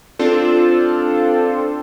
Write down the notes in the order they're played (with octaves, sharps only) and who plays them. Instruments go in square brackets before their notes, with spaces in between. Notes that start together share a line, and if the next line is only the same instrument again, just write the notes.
[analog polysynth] C4 D4 F4 A4 C5